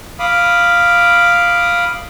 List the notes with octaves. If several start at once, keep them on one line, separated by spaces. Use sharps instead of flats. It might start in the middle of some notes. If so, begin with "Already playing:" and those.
F5 B5 D6 D#6